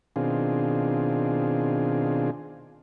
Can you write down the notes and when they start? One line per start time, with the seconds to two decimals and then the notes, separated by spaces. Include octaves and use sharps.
0.16 B2 D#3 C4 D4 F4 G#4